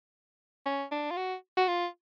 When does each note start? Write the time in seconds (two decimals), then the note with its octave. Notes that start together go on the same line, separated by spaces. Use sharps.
0.66 C#4
0.91 D4
1.11 F4
1.17 F#4
1.57 F#4
1.68 F4